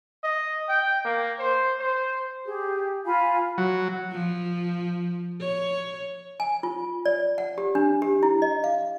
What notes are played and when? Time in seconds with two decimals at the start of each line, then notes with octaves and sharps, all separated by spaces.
0.24 D#5
0.69 G5
1.05 A#3
1.39 C5
1.79 C5
2.46 G4 G#4
3.05 F4 F5 G#5 B5
3.58 F#3
4.12 F3
5.41 C#5
6.40 G#5
6.63 F4
7.06 D5
7.38 F#5
7.58 G4
7.75 D4
8.02 G4
8.23 E4
8.42 D#5
8.64 F5